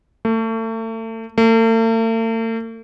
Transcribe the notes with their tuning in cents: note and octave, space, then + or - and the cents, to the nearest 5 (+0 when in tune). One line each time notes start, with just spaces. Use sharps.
A3 +35
A3 +45